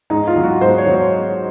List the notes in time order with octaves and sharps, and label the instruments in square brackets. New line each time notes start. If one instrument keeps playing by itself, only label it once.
[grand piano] G#2 D#4
F4
F#3
F#4
G#2 C5
C#5
F#3
C#5